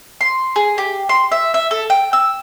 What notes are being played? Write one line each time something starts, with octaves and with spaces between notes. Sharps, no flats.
C6
G#4
G4
C6
E5
E5
A4
G5
E6